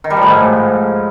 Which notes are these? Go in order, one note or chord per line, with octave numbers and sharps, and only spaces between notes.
D#3
G3
F3
A2
G#2